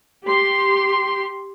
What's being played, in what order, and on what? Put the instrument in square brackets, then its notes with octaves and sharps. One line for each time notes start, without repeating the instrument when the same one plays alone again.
[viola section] G4 C6